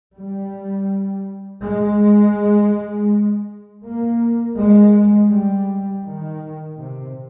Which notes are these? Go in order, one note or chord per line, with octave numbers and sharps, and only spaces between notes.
G3
G#3
A#3
G#3
G3
D#3
C3